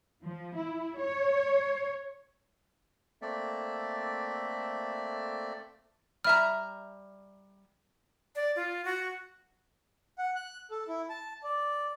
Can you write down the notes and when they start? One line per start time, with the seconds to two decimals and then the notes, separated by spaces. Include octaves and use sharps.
0.23 F3
0.55 E4
0.97 C#5
3.22 A3 A#3 C4 A4 D5 E5
6.24 G3 E5 A#5 F6
8.35 D5
8.56 F4
8.85 F#4
10.18 F#5
10.35 F#6
10.71 A4
10.88 E4
11.10 A5
11.43 D5